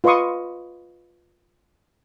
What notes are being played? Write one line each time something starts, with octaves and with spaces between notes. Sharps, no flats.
F4 B4 D#5 C6 C#6 D#6